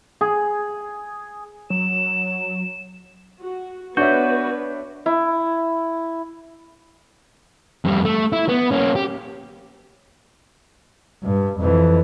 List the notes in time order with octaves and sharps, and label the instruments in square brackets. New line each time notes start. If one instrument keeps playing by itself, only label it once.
[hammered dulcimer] G#4
[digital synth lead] F#3 [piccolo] E7
[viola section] F#4
[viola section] B3 B4 [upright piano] D4 C#5 E5 [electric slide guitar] F#4 [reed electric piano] G6
[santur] E4
[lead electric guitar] F2 G3
A3
E4
B3
A#3 C#4
G4
[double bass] G2
F2 E3